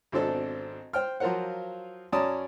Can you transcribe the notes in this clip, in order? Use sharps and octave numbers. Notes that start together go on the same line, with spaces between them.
G#1 B2 C4 D4 A4 C5
C5 G5 F6
F3 F#3 F4 A#4 C5 F#5
F#2 C#4 D5 A5 A#5 D#6